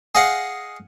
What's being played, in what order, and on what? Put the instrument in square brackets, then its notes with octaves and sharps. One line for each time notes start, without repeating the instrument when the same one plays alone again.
[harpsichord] G#4 D#5 F5 F#5